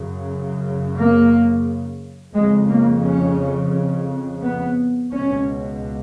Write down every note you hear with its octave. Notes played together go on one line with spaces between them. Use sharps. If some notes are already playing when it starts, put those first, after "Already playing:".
Already playing: F#2 C#3
A#3
F2 C#3 G#3
A#3
C#4
B3
C#2 B2 C#4